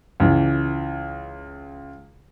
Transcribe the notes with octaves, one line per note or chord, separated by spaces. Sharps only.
C#2 E3